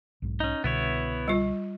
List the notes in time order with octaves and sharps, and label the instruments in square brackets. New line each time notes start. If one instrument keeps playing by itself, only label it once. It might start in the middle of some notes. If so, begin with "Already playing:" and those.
[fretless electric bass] B1 G#2
[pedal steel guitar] C#4 D#4
[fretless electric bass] C2 B2 D3 [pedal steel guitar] B3 E4 C#5
[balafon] G3 F4